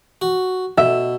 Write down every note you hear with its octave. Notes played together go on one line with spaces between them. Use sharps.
F#4
B2 E5